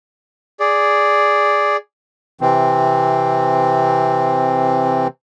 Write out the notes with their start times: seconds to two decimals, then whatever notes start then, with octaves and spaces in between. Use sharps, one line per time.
0.60 G#4 D5
2.41 C3 E3 C4